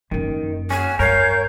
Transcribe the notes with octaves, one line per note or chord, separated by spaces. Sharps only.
F#2 D#3 A#3
C#4 F#4 G#5
G2 A#4 C#5 F5 G6